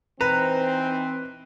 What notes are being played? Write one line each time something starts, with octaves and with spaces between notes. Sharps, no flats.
E3 C4 D#4 B4 A#5